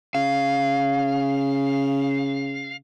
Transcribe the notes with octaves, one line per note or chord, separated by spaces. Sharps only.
C#3 F5